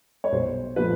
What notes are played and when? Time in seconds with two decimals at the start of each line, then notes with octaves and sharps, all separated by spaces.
0.24 C#5
0.32 B1 C5
0.76 A#2 F3 A3 B4